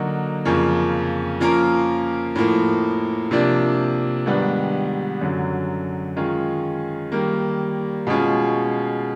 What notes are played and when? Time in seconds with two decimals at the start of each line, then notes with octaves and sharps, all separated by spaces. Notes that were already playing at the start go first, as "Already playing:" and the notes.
Already playing: D3 F#3 A#3 D#4 F#4
0.45 F2 C#3 F3 A#3 C#4
1.40 F3 A#3 C#4 F4 A#4
2.36 A2 F3 A#3
3.31 C3 F3 A#3 D4
4.26 G#2 D#3 G3 B3 D4
5.21 F#2 D3 F#3
6.16 D#3 G#3 C#4 F4
7.12 D#3 G3 A#3
8.07 B2 G#3 C#4 F4